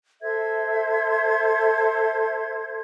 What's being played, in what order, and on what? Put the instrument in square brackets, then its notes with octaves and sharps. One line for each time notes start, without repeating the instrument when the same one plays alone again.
[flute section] A4 C5 E5 G#6